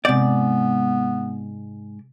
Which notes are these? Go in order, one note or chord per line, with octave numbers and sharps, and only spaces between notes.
G#2 C3 B3 C4 D5 G6